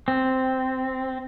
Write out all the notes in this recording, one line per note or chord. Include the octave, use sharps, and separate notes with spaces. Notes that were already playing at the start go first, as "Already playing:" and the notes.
C4